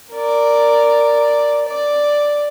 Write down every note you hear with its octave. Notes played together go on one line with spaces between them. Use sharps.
A#4 D5
D5